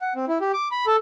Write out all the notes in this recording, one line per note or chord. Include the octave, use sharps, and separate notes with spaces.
F#5
C4
E4
G4
D6
B5
A4